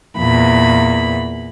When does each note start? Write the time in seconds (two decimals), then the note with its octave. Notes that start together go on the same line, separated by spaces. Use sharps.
0.17 E2 A#2 B5